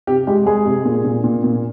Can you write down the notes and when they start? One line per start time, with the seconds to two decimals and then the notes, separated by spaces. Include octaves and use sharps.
0.07 C3 G4
0.27 G#3 G4
0.46 G#3 G#4
0.66 C3
0.85 A#2
1.04 A#2
1.24 A#2
1.44 A#2